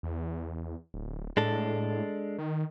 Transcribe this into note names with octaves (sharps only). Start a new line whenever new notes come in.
E2
D1
A2 G#3 D4 A4
D#3